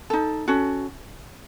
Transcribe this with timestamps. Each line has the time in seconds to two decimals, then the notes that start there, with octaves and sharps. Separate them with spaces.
0.10 D#4 A4
0.48 C#4 F#4 A4